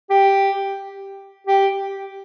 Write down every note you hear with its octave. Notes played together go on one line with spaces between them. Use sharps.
G4
G4